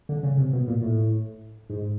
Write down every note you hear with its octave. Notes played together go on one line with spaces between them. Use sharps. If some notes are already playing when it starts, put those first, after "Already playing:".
D3
C#3
C3
B2
A#2
A2
G#2